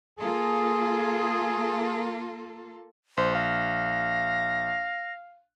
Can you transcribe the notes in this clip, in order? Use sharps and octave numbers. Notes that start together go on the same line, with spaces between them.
A#3 F4 G#4 A4
A#1 C5
F5 A#6